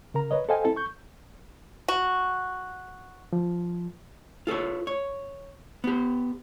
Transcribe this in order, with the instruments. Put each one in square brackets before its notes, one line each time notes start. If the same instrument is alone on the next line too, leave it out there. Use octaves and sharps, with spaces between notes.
[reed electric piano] C#3 A#4 A#5
B4 C#5 D#5
A4 C5 D#5 F5 G5 G#5
C4 E4 A4
C#6 G6
[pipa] F#4
[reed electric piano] F3
[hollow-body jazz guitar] F4 A4 B4 C#5
C#5
B3 G4